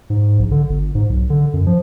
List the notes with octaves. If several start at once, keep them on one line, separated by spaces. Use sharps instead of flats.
G#2
A#1
D3
G1
G#2
B1
D3
F#2
F3